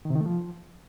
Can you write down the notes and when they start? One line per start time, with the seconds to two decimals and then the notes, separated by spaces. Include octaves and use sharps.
0.05 D#3
0.10 C3
0.15 D#3
0.21 A3
0.26 F3